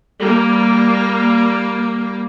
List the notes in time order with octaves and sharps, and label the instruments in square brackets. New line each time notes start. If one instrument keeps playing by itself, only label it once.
[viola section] G3 A#3